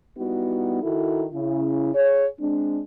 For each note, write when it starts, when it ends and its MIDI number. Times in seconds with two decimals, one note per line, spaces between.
0.17 0.81 55
0.17 0.81 59
0.17 0.81 63
0.17 0.81 64
0.17 0.81 66
0.83 1.25 51
0.83 1.25 64
0.83 1.25 66
0.83 1.25 69
0.83 1.25 70
1.32 1.92 49
1.32 1.92 64
1.95 2.26 68
1.95 2.26 73
2.40 2.81 56
2.40 2.81 60
2.40 2.81 62